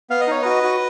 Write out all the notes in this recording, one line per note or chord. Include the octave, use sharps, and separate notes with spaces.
B3 F5
D#5
D#4 C#5
F#4 B4 D#5
F#4